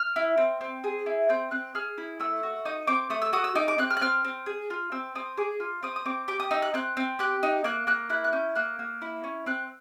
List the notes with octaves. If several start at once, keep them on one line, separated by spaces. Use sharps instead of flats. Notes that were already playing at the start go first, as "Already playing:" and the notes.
Already playing: F6
E4
C4
C4
G#4
E4
C4 G6
C4 F#6
G#4 F6
E4
A3 E6
F#4
D#4 D#6
C4 D6
A3 D#6
E6
F#4 D#6
E6
D#4 D6
D6
C4 F#6
F6
F#6
C4 F6
C4
G#4
F4
C4 E6
C4 D#6
G#4 D6
F4
C4 D#6
D#6
C4 D6
G4 D6
D#6
D#4 E6
F#6
C4 F#6
C4
G4 F#6
D#4
A#3 F#6
A#3 F#6
E4 F#6
F#6
C#4 G6
A#3 F#6
A#3
E4
C#4
C4 F#6